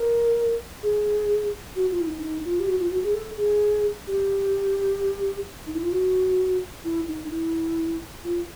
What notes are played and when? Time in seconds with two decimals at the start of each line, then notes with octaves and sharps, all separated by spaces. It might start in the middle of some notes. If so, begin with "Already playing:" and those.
Already playing: A#4
0.83 G#4
1.76 F#4
1.90 F4
2.00 E4
2.07 D#4
2.22 D#4
2.45 F4
2.60 G4
2.68 F#4
2.79 F4
2.91 F#4
3.03 G#4
3.14 A4
3.37 G#4
4.07 G4
5.67 D#4
5.75 E4
5.83 F4
5.92 F#4
6.84 E4
7.08 D#4
7.31 E4
8.24 F4